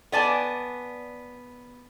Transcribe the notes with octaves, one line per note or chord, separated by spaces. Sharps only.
B3 D5 G#5 A5